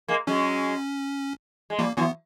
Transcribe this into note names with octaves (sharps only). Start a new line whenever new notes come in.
G#3 A#3
F#3 G#3 C#4
G#3
F3 G3 A#3
E3 F#3 B3